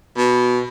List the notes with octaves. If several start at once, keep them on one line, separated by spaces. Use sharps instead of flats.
B2